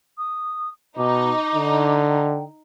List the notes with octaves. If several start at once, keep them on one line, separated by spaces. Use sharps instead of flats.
D#6
B2 D#4 D6
D3
G5